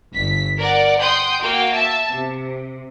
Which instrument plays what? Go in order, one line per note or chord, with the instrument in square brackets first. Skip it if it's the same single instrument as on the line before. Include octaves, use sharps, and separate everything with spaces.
[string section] G1 B6
A#4 D5 F#5
F#5 G5 C6 D#6 G6
A#3 F#4 F5 G5
E5 A5
C3